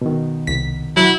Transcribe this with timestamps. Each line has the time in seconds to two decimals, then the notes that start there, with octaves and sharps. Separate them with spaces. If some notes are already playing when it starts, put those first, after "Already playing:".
0.01 B2 D#3
0.47 C2 B6
0.97 F#3 E4